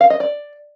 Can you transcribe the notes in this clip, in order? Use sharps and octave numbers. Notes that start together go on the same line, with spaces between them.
F5
D#5
D5